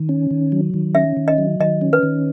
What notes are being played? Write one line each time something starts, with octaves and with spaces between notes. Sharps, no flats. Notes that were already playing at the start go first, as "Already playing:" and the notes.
Already playing: D#3
C#4
D#3
F#3
D#3
C#4 E5
D#3
D#5
F#3
D#3 D#5
C#4
B4
D#3